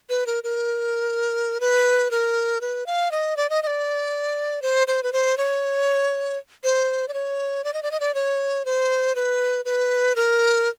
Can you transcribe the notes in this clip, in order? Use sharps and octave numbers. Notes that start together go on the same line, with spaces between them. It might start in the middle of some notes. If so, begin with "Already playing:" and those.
B4
A#4
A#4
B4
A#4
B4
F5
D#5
D5
D#5
D#5
D5
C5
C5
B4
C5
C#5
C5
D5
C#5
D5
D#5
D5
D#5
D5
C#5
C5
B4
B4
A#4